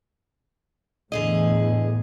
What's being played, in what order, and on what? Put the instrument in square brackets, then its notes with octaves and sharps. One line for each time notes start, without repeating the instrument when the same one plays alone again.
[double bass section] E2 A2 [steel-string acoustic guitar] D3 G#4 D#5